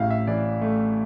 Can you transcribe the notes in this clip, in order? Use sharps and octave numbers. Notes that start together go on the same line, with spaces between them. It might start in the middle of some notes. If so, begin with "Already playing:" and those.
Already playing: A1 A2 E5 F5
E5
E3 D5
A3